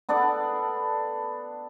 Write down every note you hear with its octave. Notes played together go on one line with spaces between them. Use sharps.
B3 D4 A4 D5